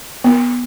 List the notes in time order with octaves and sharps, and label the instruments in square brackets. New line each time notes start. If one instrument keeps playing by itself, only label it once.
[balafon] B3